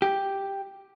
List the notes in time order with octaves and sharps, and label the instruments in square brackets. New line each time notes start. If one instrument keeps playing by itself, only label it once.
[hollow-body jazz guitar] G4